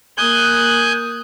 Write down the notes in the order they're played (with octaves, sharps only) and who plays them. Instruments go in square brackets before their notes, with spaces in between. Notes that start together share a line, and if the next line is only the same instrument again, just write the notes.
[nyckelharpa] A#3 D#6 [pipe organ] G#5 F#6 G6